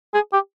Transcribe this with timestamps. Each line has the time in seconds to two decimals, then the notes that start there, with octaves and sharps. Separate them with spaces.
0.14 G#4
0.33 G4